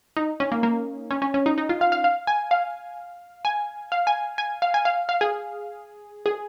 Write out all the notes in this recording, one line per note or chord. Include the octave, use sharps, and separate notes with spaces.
D#4
C#4
A#3
A#3
C#4
C#4
C#4
D#4
D#4
F4
F5
F5
F5
G#5
F5
G#5
F5
G#5
G#5
F5
G#5
F5
F5
G#4
G#4